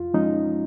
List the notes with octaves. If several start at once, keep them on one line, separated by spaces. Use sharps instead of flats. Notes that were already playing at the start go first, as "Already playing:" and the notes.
Already playing: F2 F4
F3 G#3 C#4 D#4